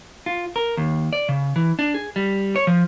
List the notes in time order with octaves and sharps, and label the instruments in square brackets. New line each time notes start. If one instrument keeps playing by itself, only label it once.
[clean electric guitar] F4
A#4
D#2
D5
C#3
E3
D4
G#4
G3
C#5
F3